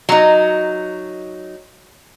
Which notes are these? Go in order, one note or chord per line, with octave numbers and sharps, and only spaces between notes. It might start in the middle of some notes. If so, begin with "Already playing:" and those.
F#3 D#4